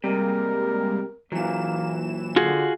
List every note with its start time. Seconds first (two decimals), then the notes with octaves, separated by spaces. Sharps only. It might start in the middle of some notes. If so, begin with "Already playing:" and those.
0.04 C3 G3 G#3 A#3 A#4
1.32 A#2 E3 F#3 A#3 E7
2.36 D3 F4 F#4 G#4